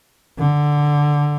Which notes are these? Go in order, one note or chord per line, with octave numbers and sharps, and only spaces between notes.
D3